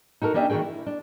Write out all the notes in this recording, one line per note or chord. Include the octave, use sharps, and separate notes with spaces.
D#4 F#4 A4 A#4
A#3 C#4 D4 G4 D#5 E5
D#3 E3 F#4 G#4 G5
E4
D4